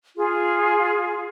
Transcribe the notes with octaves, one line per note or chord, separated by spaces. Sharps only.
F4 G#4